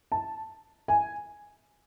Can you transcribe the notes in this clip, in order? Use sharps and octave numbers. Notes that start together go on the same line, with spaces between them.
A5
G#5